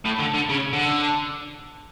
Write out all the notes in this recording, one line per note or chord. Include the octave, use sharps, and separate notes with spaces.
A2
D3
D3
C#3
D3